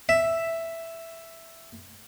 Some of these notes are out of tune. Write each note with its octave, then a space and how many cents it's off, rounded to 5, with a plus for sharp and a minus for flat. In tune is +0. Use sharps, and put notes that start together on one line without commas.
E5 +5